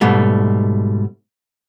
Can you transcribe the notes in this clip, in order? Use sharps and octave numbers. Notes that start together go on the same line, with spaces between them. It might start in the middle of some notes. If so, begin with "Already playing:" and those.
G#2 B2 G3 A3